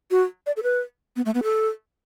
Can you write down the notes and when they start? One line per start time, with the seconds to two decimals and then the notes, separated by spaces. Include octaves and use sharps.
0.11 F#4
0.46 D5
0.57 A4
0.63 B4
1.16 B3
1.25 A3
1.34 B3
1.43 A4